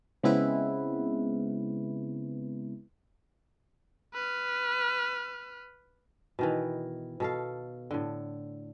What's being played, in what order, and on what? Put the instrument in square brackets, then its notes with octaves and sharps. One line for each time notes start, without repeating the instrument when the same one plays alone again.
[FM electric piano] C#3 G#3 B3 C4 E4 B4
[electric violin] B4 F6
[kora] B2 D#3 E3
B2 A4 F5
A2 D3